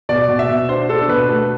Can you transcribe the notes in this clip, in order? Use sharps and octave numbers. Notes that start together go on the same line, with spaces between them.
B2 D5
B2
E5
B2
D4 C5
D4 A4
B2 B4
A3